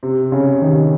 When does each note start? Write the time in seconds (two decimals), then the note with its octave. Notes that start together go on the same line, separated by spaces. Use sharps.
0.03 C3
0.32 C#3
0.62 C3 D#3